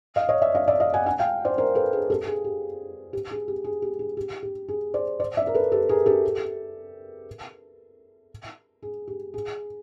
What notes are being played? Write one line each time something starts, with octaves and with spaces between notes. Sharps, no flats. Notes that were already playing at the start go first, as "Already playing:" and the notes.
D#5 F5
C#5 D#5
D5 E5
D#5 F5
D5 E5
D#5 F5
F#5 G#5
F#5 G#5
F5 G5
C5 D5
A#4 C5
A4 B4
G#4 A#4
G4 A4
G#4
G4
G4
G#4
G4
G#4
G4
G#4
G4
G4
G#4
C5 D5
C5 D5
D5 E5
A#4
A4 B4
G4 A4
G#4 A#4
G4 A4
G#4
G4
G#4